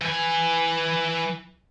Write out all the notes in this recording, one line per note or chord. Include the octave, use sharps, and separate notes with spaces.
E3 G#5